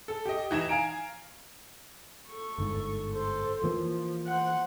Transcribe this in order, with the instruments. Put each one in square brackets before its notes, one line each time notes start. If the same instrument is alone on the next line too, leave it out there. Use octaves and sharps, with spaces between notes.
[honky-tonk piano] A4
G4 D#5
E3 D#4 G#6 E7
F5 G#5 A#5 D7
[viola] A4 C#6
[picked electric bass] G1 G#2
[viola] A4 C5
[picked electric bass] E3 A#3 [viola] F3
[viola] C5 F#5